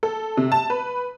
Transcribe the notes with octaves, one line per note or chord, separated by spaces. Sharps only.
A4
C3
A5
B4